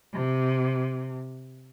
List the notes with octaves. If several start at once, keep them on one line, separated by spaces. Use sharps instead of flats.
C3